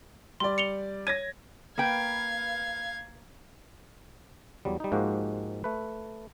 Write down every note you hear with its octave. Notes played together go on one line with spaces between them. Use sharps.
G3 D5 C6
C#7 F7 G7
C#5 G#6 A#6 D#7
A#3 B4 F5 G5 G#6
E2 F#3 G3
G3 D#4
G#2 F3 G#3 A#3 F#4 G4
A3 B4